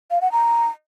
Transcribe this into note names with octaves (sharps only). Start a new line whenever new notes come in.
F5
F#5
A#5